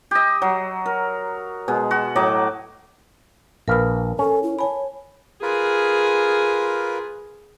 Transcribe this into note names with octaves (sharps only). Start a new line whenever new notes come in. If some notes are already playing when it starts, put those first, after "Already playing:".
G4 D#5
F#3
A#4
B2 G#3
F#4
A2 F#3 D#5 D6
A#1 A#4 B4 F5 B5
C#4 A4
E4
C#5 G#5 A5 B5
F4 G#4 A#4 B4